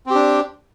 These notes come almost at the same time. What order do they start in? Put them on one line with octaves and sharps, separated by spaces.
C4 G4 D4